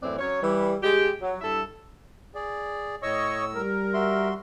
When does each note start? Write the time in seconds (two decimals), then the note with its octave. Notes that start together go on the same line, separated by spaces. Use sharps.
0.03 F#2 A2 E3 C4 D5
0.19 F#3 C#4 C#5
0.43 E3 G3
0.83 G#3 G4
1.22 F#3
1.41 G2 E4 A4 E5
2.35 G#4 D5
3.03 A2 C#5 D#5 C#6 E6
3.55 G3 A#4
3.94 F#4 E5 C6